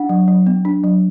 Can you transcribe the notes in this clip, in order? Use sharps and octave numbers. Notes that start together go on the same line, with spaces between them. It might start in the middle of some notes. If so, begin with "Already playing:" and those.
Already playing: D4 F#5
F#3
F#3
B3
D4
F#3